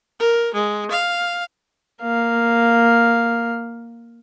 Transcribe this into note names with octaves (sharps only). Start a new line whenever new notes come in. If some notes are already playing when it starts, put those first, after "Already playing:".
A#4
G#3
F5
A#3 F5